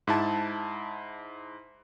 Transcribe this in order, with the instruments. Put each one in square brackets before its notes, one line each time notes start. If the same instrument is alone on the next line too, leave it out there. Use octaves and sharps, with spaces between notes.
[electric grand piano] G#2 E4 A5